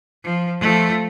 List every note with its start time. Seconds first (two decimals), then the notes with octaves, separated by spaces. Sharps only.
0.23 F3
0.60 F3 A3